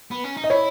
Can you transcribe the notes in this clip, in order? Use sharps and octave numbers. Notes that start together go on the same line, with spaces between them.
B3
C#4
D#4
D#5
E4 C#5